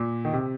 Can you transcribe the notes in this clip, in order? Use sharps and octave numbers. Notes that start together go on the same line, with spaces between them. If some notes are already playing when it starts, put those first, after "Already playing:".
Already playing: A#2
D#3
C3